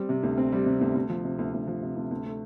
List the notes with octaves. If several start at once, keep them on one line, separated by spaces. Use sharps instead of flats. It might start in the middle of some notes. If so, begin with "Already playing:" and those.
Already playing: G3 C4
C3
D2
C4
G3
C3
D2
D2
F3
C3
D2
D2
F3
C3
D2
D2
A3